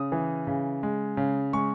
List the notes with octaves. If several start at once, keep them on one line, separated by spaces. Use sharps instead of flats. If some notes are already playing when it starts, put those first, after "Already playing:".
Already playing: C#3 D#6
E3
C#3
G#3
C#3
G#3 C#6